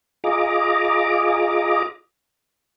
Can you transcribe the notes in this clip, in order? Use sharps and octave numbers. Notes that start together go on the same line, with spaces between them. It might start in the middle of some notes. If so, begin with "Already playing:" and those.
F4 G#4 D#5 A#5 D6